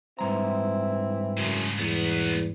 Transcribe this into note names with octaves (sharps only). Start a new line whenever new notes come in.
G#2 E3 G3 C4 E4 A#5
F#2 C#3 F3
E2 F#3 B3